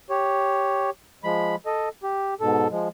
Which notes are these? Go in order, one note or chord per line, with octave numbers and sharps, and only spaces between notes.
G4 C#5
F3 G#3 B5
A4 D#5
G4
G#2 B2 A4
F3 G#3